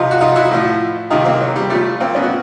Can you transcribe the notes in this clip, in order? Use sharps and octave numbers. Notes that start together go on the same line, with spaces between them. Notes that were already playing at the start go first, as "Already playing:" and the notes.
Already playing: C3 F3 D#4 F4
F#4
D#4 F4
E4 F#4
A2 F3
C3 D#3 D#4 F4
A#3 C4
F#3
G3
A#2 F3 G3 A3
A#3 C4
B3 C#4
F#4